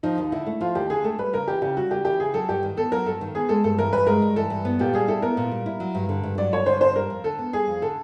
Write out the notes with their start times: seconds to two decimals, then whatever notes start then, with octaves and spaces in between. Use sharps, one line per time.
0.03 F3 D#4
0.18 D#2
0.32 D3 E4
0.46 A3
0.61 F3 F4
0.75 D#2 G4
0.90 D3 G#4
1.04 A3 A4
1.19 G3 B4
1.33 C#3 A#4
1.48 E3 G4
1.62 C#3 G4
1.77 G3 F#4
1.91 C#3 G4
2.05 E3 G4
2.20 C#3 G#4
2.34 F#3 A4
2.49 G2 G4
2.63 D#3
2.77 B3 A4
2.92 F#3 A#4
3.06 G2 A4
3.21 D#3
3.35 B3 G#4
3.49 G#3 A4
3.64 G2 A4
3.78 E3 A#4
3.93 G2 B4
4.07 G#3 A#4
4.22 G2
4.36 E3 A4
4.50 G2
4.65 B3
4.79 A#2 G4
4.93 G3 G#4
5.08 E4 A4
5.22 B3 A#4
5.37 A#2
5.51 G3
5.66 E4
5.80 F#3
5.95 G2
6.09 D3
6.23 G2
6.38 F#3 D5
6.52 G2 C#5
6.66 D3 C5
6.81 G2 C5
6.96 G3 A#4
7.10 F2
7.24 D3 A4
7.39 B3
7.53 G3 G#4
7.68 F2
7.82 D3 A4